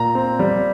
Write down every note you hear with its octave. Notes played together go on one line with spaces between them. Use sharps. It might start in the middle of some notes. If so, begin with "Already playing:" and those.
Already playing: A#2 A#5
C4
G3